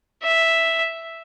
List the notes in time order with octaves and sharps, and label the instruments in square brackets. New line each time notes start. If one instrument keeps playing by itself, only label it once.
[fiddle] E5